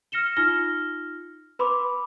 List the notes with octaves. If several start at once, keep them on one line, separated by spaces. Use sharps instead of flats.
F6 A#6 C#7 E7 G7
D#4 F4 F6 A#6 G7
B4 B5 C6 D6